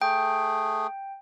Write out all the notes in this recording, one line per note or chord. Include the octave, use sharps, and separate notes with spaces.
A3 G#4 G5